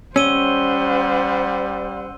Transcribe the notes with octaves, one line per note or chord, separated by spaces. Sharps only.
G3 C#4 C5 F#5 E6 D#7 G7